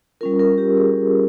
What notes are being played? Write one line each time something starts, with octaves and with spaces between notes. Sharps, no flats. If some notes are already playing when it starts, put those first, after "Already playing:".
G3 C#4 F4 A#4
A#4
G4
G#4